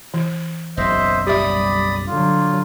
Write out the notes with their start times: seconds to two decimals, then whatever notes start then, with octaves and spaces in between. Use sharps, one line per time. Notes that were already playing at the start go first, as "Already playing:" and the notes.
0.14 E3
0.77 F#1 B1 C5 D#5 E5
1.27 G3 G4 D5 E5 B5 D#6
2.07 D3 F#3 F4